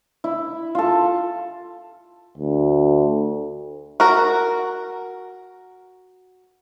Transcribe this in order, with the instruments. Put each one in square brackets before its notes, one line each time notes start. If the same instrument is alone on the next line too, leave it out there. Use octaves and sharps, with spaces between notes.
[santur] E4
F4 A4
[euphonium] D2
[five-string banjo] F#4 A#4